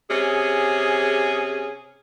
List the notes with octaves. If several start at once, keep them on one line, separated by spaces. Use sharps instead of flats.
C3 C#4 G#4